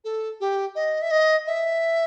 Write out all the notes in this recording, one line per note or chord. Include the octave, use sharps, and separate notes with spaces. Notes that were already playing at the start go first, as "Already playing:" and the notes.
A4
G4
D#5
E5
D#5
E5